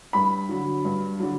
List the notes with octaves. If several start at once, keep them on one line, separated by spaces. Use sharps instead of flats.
G2 B5
D3 F#3
G2
D3 F#3